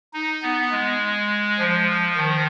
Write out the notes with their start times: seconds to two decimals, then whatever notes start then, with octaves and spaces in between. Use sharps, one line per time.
0.13 D#4
0.42 B3
0.72 G#3
1.59 F3
2.16 D#3